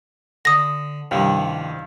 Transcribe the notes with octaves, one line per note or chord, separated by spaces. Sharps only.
D3 D#6 A#6
C2 G2 D#3 F3 A#3